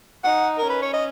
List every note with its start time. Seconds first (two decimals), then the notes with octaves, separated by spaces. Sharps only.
0.24 D#4 F#5
0.58 A#4
0.65 C#4 B4
0.82 C#5
0.94 D#5